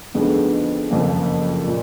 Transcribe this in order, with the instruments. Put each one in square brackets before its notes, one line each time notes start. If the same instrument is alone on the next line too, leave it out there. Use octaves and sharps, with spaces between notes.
[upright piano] F2 D3 G#3 B3 D#4
F#1 F2 F3 A#3
A#2